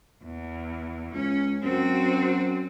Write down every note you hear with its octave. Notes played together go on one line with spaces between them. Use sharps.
E2
C#2 C#4
F#2 C4 F#4